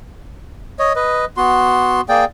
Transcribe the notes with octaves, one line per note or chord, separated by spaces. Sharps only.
C#5 D#5
B4 D#5
B3 F#4 C6
A#3 G#4 D5 G5